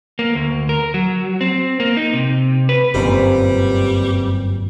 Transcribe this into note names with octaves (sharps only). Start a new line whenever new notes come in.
A#3
D2
A#4
F#3
C4
A#3
D#4
C3
B4
G1 F#2 A#2 G3 A#3 C4 B4